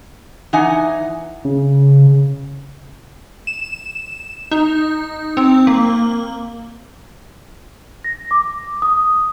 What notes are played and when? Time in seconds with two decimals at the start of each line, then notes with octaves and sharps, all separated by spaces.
0.53 E3 D#4 F#5 G#5
1.45 C#3
3.47 E7
4.51 D#4
5.37 C4
5.67 A#3
8.04 A#6
8.31 D6
8.82 D#6